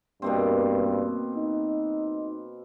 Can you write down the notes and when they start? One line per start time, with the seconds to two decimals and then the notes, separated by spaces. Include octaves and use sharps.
0.22 G2 B2 A#3 C4
1.36 D#4